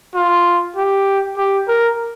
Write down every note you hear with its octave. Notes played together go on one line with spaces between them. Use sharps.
F4
G4
G4
A#4